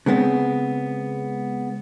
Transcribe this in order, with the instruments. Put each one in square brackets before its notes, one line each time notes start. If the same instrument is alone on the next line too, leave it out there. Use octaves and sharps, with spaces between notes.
[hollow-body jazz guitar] C#3 G#3 B3 C4